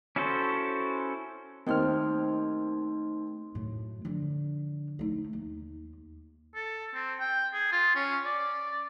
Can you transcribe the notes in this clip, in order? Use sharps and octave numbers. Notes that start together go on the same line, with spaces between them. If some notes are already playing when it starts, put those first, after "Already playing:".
C#4 E4 F#4 A4 C5
D#2 A3 C4 D#4 C6 F6
F#2 A2
F2 D3
A3 D#4
D#2
A4
C4
G5
G#4
F4
C#4
D5